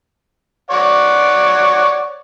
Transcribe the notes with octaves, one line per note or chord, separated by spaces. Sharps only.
C#5 D5 F#5